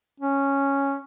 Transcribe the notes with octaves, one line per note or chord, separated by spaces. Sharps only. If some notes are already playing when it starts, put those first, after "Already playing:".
C#4